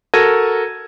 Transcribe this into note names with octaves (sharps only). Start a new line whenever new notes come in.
F#4 A4 A#4 G#6 A#6 D#7